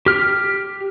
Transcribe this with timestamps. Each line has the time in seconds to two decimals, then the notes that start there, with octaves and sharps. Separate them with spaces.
0.06 G4 F6